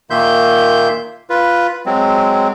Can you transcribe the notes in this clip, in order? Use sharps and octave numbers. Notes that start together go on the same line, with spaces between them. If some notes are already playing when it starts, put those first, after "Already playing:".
A#2 D#3 A#3 E5 C6 G6
F4 B4
F#3 G#3 C4